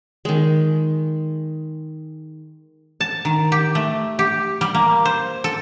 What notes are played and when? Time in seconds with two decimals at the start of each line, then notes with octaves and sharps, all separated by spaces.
0.25 D#3 G#3
3.01 A5
3.25 D#3
3.52 G4
3.75 A3
4.19 G4
4.61 G3
4.75 A#3
5.05 C5
5.44 A4